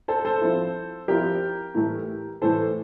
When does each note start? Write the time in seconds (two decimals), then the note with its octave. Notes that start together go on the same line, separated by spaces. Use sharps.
0.08 A4 C5
0.25 A4 C5
0.41 F3 C4 E4
1.08 F3 C4 E4 G4 A#4
1.75 A2 E3 A3
2.42 A2 E3 A3 A4 C5